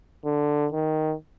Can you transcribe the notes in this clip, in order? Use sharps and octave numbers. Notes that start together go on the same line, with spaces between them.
D3
D#3